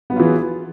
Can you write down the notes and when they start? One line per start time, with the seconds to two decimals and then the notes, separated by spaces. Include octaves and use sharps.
0.10 B3
0.13 F#3
0.16 F4
0.20 E3
0.23 G#4